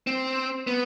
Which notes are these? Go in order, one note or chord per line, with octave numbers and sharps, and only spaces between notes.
C4
B3